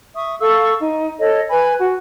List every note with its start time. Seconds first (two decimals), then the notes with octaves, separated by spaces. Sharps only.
0.16 E5 C#6 D#6
0.40 A4 F5 C#6 E6
0.80 D#4
1.19 A4 C#5 D#5
1.49 B4 G#5 B5
1.78 F#4